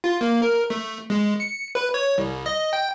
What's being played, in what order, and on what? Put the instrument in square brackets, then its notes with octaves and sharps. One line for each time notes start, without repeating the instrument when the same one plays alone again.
[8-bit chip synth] F4
A#3
A#4
A3
G#3
C#7
B4
C#5
C2
D#5
G5